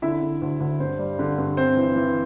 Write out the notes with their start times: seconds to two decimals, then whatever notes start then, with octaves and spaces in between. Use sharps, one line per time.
0.02 D3 E4 E5
0.22 D3
0.42 D2
0.60 D2
0.80 G2 C5
0.99 G3
1.19 D3
1.38 G2
1.57 C4 C5
1.77 E3
1.96 E3